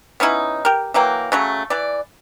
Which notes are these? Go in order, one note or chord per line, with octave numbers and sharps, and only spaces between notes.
B3 C#4 D#4 E4
G4 A#4
E3 F#3 A#3 G5
C#3 F#3 A3
E3 D5